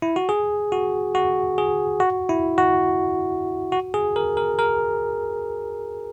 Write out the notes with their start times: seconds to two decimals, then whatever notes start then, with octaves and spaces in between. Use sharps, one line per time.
0.02 E4
0.16 F#4
0.29 G#4
0.72 F#4
1.15 F#4
1.58 G#4
2.00 F#4
2.29 E4
2.58 F#4
3.72 F#4
3.94 G#4
4.16 A#4
4.37 A#4
4.59 A#4